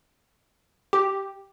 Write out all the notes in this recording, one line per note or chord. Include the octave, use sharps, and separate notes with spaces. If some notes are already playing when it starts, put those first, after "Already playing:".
G4